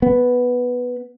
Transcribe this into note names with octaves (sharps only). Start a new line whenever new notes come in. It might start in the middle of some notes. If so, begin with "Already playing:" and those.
B3